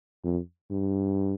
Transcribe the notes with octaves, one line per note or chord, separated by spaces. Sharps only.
F2
G2